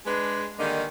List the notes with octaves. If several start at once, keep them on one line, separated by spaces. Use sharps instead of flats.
G#3 D4 B4
D3 D#3 G3 G#3 A#3 D#4